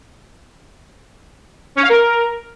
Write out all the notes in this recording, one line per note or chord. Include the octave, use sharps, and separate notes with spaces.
C#4
F5
A#4